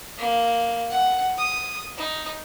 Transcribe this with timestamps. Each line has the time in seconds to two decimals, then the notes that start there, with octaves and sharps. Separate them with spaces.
0.18 A#3
0.90 F#5
1.37 D#6
1.97 D#4